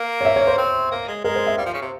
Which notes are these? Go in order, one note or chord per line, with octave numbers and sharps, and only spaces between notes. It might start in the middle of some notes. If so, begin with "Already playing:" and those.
Already playing: A#3
C#5
E5
C#5
C5
C4
A#3
G#3
G#3 A#4
C5
E5
G3 F5
F3
C#3
C3